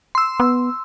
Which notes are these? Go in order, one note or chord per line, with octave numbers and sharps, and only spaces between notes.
C6 E6
B3